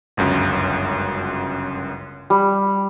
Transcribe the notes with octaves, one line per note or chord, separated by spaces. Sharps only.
G1 C#2 F#2
G3